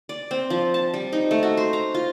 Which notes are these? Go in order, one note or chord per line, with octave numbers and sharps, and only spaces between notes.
D5
C4
F3
A5
G3
D#4
A3
F#4
C5
A#5
F4